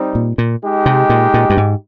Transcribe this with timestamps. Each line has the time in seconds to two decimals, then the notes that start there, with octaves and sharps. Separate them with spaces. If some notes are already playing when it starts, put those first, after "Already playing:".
Already playing: G3 C4 D#4
0.15 A#2
0.38 A#2
0.62 G#3 D#4 G4
0.86 C3
1.10 A#2
1.34 A#2
1.50 G2
1.57 G#2